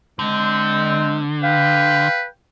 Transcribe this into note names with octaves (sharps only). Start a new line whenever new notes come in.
D3 G#3 C4
B4 F5 G5